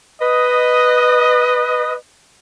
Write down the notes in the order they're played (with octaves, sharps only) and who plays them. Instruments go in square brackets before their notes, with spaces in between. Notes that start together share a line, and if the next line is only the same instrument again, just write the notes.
[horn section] B4 D#5